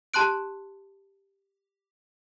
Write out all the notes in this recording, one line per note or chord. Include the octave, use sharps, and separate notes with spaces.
G4 A5 C6 F#6 D7